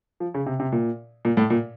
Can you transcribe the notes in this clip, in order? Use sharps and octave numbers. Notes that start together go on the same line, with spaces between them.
F3
C#3
C3
C3
A#2
A#2
A2
A#2